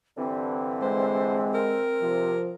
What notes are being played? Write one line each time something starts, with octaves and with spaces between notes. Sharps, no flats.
G2 D3 E3 C4
G#3 C5
A#4
C3 F3